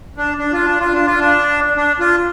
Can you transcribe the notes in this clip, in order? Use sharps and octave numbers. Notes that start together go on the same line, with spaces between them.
D4
D4
F4
D4
F4
D4
F4
D4
D4
F4